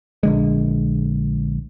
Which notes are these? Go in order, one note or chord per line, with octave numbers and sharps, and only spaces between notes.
A#1 D3 G#3